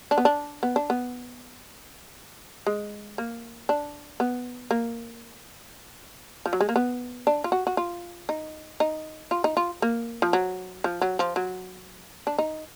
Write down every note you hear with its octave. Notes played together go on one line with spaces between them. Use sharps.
D4
B3
D4
B3
D4
B3
G#3
A#3
D4
B3
A#3
F3
F#3
G#3
A#3
B3
D4
F4
F#4
F#4
F4
D#4
D#4
F4
D#4
F4
A#3
F3
F#3
F3
F#3
F3
F#3
D4
D#4